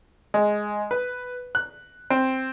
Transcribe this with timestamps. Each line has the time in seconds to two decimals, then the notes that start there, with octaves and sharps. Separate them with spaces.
0.34 G#3
0.91 B4
1.55 F#6
2.10 C4